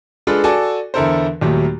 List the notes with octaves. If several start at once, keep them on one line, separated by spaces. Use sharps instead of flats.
G#3 D4 F4 G#4 A4 B4
F#4 A4 D5 G#5 A5 D6
E2 D3 E4 A4 A#4 C5
D#2 A#2 D#3 F#3 G3 A3